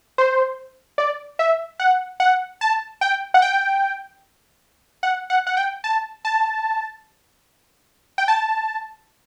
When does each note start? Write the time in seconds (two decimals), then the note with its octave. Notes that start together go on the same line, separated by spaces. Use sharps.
0.18 C5
0.98 D5
1.39 E5
1.80 F#5
2.20 F#5
2.61 A5
3.01 G5
3.34 F#5
3.42 G5
5.03 F#5
5.30 F#5
5.47 F#5
5.57 G5
5.84 A5
6.25 A5
8.18 G5
8.28 A5